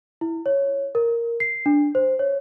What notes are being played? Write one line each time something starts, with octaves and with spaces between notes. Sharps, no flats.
E4
C#5
A#4
C7
D4
C5
C#5